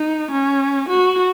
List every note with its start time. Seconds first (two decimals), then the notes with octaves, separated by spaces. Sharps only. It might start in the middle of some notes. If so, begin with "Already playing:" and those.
Already playing: D#4
0.32 C#4
0.89 F#4